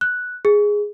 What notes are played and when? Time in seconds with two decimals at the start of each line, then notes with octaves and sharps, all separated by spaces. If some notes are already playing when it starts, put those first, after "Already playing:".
0.01 F#6
0.45 G#4